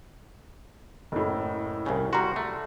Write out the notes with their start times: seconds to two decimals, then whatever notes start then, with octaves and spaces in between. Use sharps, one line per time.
1.12 F#1 A2
1.86 C2 C#3
2.13 G3 F#4 A#5 C6
2.36 A3